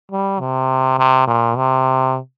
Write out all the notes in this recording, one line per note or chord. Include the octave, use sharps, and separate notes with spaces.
G3
C3
C3
A#2
C3